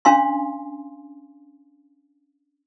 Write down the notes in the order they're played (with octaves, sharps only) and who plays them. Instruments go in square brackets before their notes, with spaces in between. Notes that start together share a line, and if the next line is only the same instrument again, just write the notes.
[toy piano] C#4 D4 F5 G#5 C6